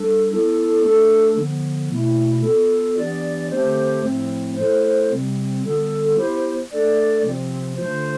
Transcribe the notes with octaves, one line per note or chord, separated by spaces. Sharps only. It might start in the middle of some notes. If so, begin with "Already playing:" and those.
Already playing: G3 D4 A4
B3 E4 A4
A3 D4 A4
D3 F3 B3
B2 A3 E4
B3 F4 A4
E3 B3 D4 G4 D5
D3 A3 C4 G4 C5
A2 F3 A3 C4
A3 E4 A4 C5
C3 G3 C4
D3 G3 B3 F4 A4
B3 E4 G4 C5
A3 D4 A4 D5
C3 F3 C4 F4
D3 A3 D4 F4 C5